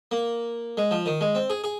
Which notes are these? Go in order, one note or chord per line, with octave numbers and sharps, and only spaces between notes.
A#3
G#3
F3
D#3
G#3
C4
G#4
G#4